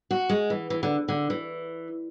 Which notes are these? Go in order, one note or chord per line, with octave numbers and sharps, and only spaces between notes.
F#4
G#3
E3
E3
D3
D3
E3